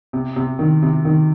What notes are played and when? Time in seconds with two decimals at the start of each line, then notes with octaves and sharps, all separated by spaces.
0.13 C3
0.36 C3
0.59 D#3
0.83 C3
1.05 D#3